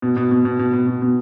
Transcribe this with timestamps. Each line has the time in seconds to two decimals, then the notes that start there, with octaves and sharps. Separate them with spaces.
0.02 B2
0.17 B2
0.31 B2
0.45 B2
0.59 B2
0.73 B2
0.87 B2
1.02 B2